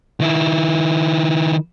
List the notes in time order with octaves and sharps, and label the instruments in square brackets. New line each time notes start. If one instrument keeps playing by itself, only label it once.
[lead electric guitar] D#3 E4